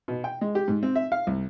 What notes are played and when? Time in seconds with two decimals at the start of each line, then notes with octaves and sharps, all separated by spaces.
0.08 B2
0.24 G5
0.41 G#3
0.55 G4
0.68 G#2
0.83 C4
0.96 E5
1.12 F5
1.27 C2